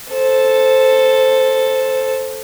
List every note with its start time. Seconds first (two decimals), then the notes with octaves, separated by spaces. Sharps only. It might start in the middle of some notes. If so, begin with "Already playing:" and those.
0.11 A4 C5